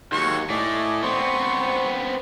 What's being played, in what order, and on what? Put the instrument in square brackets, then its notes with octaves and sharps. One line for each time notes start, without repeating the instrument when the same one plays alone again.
[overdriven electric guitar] D#2 [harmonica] F#3 G#3 C#6
[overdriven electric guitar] A2 [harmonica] D5 D#5 G#5
[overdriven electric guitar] B3 C4 [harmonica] C6 C#6